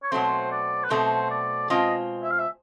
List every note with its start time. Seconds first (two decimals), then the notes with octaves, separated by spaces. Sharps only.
0.03 C#5
0.11 B2 F#3 A3 C4 C5
0.52 D5
0.84 B4
0.90 B2 F#3 A3 C4 C5
1.31 D5
1.70 B2 G#3 C4 F4 D#5
2.23 E5
2.31 F5
2.39 E5